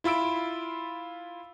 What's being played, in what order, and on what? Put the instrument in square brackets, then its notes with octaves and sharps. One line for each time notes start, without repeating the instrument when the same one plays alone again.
[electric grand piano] E4 F4 B5 E6 D7